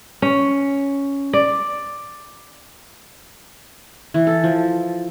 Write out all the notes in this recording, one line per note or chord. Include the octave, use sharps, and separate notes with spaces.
C#4
D5
E3
A4
F3